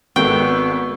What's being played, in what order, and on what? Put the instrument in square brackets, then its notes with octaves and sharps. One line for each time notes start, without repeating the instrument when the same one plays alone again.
[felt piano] G#1 A4 [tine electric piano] G#3 A#4 C#6 [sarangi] B3 [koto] G5